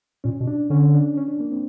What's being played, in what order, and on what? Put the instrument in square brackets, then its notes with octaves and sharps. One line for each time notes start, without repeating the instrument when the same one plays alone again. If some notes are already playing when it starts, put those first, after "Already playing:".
[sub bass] A#2 [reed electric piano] C#4
[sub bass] B2
[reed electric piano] D4
[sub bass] D3 [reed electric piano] C#4
[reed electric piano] D4
C#4
D4
A#3
C4